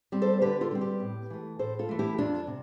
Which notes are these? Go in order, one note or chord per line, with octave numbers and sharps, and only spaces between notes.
G3 C4
A4 C5
D3 G4 B4
F4 A4
G3 C4
G4 B4
A2
E3 A3
A2 A4 C5
F4 A4
E3 A3
E4 G4
F2 D4 F4
C3